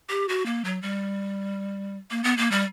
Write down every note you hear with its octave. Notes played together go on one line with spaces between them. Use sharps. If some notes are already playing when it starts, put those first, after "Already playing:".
G4
F#4
A#3
F#3
G3
A#3
B3
A#3
G3